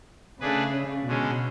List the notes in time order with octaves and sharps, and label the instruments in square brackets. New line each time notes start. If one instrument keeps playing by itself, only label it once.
[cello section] C#3 [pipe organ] A3 D4 G#4 B4
[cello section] B2 [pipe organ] D3 G#3 C#4